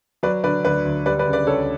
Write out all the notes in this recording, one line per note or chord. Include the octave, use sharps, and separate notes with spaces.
F#3 B4 D5
D3 B4 D5
D2 B4 D5
D2
G3 B4 D5
B4 D5
C#3
B4 D5
C#2 A4 C#5